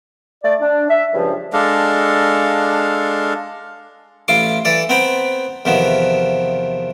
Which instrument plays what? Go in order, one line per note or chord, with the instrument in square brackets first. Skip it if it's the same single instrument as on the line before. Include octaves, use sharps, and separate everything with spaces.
[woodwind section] A3 D5
D4
E5
C#2 G2 F3
[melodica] G#3 D4 A4 F5
[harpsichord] A1 E4 F4 C6 D6
E3 A4 D5
B3 C4 G5 A#5 B5
E2 C3 D#3 F3 B3